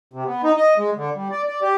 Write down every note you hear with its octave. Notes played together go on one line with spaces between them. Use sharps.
C3
B3
D#4
D#5
G#3
D3
G3
D5
D5
G4